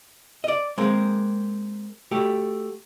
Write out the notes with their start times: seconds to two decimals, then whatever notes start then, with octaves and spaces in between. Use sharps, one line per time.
0.44 D5 D#5
0.78 G#3 A#3 C4
2.11 A3 F#4 G4